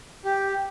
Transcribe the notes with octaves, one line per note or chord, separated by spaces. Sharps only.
G4